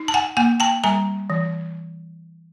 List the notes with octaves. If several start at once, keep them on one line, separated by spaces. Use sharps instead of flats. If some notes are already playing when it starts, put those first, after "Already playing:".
Already playing: D#4
A5
F#5 G#5
A#3 F#5 G#5
G5 A5
G3 G#5 A#5
E3